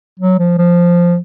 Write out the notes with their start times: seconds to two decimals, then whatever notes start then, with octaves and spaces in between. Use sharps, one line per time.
0.19 F#3
0.39 F3
0.58 F3